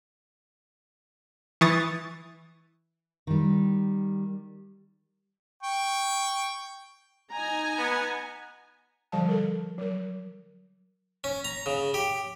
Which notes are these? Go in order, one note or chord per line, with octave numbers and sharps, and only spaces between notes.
E3 C#6 D#6 A6
D#3 G3
G5 C#6
D#4 G#5 A#5
B3
D3 F3 G3 F5 A5
A4 A#4
F#3 A#4
C#4
A#5
C#3
G4